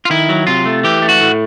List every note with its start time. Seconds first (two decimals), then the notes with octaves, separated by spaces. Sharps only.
0.05 F4
0.10 D#3 E4
0.29 F#3
0.47 C3 F4
0.66 A3
0.84 E3 G4
1.02 A3
1.09 F#4
1.21 A2